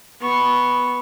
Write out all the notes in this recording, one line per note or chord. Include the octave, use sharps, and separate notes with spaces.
B3 C#6